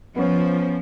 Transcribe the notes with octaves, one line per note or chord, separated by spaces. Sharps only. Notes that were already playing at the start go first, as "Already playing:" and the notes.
F3 B3 C#4